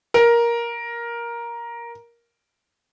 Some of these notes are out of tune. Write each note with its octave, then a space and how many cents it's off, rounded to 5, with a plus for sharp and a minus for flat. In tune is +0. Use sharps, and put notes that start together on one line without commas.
A#4 +10